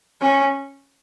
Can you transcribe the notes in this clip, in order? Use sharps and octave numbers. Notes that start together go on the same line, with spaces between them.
C#4